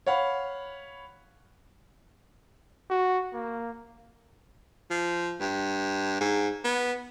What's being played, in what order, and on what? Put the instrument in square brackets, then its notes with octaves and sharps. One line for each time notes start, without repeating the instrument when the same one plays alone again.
[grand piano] C#5 F5 F#5 B5
[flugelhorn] F#4
A#3
[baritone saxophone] F3
G2
G#2
B3